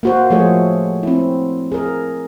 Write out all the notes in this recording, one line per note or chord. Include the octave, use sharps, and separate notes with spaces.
A#3 F#4 C5
F3 G#3 A3 F#4 G#4 C#5
C4 E4
G#4 A#4